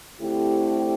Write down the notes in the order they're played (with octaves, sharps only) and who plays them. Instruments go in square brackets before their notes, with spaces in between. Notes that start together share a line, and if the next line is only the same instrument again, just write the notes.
[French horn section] D3 A3 C4 E4 G4